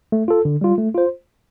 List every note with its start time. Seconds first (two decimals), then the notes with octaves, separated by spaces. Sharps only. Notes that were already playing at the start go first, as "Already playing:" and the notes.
0.12 A3
0.28 F4 A4
0.45 D3
0.61 G3 F4
0.78 A3
0.95 F4 C5